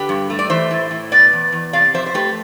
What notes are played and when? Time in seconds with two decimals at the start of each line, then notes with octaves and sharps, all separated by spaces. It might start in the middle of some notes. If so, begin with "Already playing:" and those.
Already playing: D3 G4 B4
0.09 G2
0.30 A3
0.39 D5
0.50 E3 C5 E5
0.71 A2
0.91 A2
1.12 B2 B4 D5
1.33 E2
1.52 E2
1.73 C3 D5 F5
1.94 F2 C5 E5
2.06 C5
2.14 A3 G4 B4